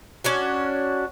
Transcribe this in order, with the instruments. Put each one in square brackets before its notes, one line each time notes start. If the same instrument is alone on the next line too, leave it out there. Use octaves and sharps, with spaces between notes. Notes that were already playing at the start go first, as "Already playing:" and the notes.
[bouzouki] C#4 D4 F#4